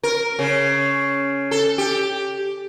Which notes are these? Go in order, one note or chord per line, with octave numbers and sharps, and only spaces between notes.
A#4
C#3
A4
G4